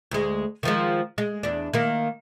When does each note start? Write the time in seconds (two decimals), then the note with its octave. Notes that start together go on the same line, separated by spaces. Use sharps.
0.11 D2 G#3
0.63 D#3 F3 G#3
1.18 G#3
1.43 E2 D4
1.73 D#3 A#3